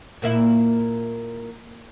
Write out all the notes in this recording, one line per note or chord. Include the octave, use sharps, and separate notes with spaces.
A#2 A#3 E4